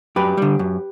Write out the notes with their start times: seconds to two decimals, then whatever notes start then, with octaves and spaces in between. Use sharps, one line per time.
0.16 F#2 G4 B4
0.37 D3 G3
0.59 F#2